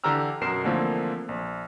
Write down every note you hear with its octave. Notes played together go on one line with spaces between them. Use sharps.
D3 E3 G4 A#5 E6 F6
F#2 B2 A#4 C7 E7
D3 E3 F3 A3 A#3 C4
A#1